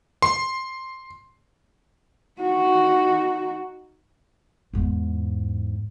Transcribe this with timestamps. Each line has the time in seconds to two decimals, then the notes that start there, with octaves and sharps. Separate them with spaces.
0.22 C6
2.41 D#4 F#4
4.73 E2 G#2